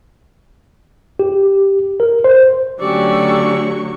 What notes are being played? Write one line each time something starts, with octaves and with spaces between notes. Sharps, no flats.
G4
A#4
C5
D3 F#3 A3 C#4 G4 D5 C#6 E6